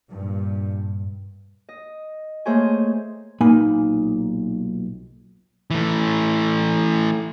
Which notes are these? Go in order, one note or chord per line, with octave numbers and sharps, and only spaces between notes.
G2 A#2
D#5
A3 A#3 G#4 C5 C#5 G#5
B1 A#2 A#3 D#4 G#5 B5
E3 A3